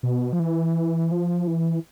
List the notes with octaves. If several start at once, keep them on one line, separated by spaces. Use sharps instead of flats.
B2
F3
E3
F3
E3